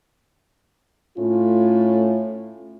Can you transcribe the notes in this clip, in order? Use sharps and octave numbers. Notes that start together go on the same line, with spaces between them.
A2 A3 C#4 F4